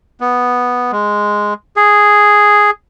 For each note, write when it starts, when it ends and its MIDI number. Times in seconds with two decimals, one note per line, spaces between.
0.20 0.92 59
0.92 1.54 56
1.76 2.70 68